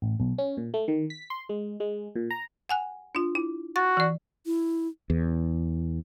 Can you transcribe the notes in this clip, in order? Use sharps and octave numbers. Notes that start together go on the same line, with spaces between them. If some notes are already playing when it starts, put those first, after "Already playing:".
A1
B1
C#4
A#2
A3
D#3
B6
C6
G#3
G#3
A#2
A#5
F#5 G#5 F#6
D4 F4
E4
F#4 A6
E3 D5
E4
E2